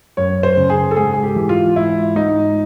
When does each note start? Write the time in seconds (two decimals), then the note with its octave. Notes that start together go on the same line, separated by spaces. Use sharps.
0.17 F#2 C#5
0.43 C5
0.57 C#3
0.70 G#4
0.91 A4
0.96 G#2 G#4
1.13 G#4
1.23 G4
1.36 E3
1.49 F4
1.76 G#2 E4
2.16 G#2 D#4